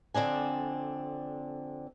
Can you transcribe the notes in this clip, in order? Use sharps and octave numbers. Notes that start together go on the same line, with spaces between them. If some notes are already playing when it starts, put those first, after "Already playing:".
F2 D3 C4 D4 G#5